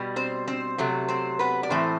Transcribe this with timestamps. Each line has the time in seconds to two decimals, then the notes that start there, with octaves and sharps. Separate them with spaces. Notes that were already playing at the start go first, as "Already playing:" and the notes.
Already playing: B2 G3
0.16 C4 C5
0.47 C4 C5
0.78 C3 F#3 A3
1.08 C4 C5
1.39 B3 B4
1.63 D5
1.70 A2 E3 A3 C4 C5